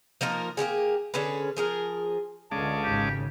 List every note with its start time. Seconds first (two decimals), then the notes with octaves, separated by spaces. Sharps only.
0.21 F3 A#3 D#4 A#4
0.57 A#3 C4 G4 G#4
1.14 D3 C#4 G#4 B4
1.57 F3 G#4 A#4
2.52 C#2 D3 G#3 C#4 F5 A5 D6
2.84 G#1 C#3 G4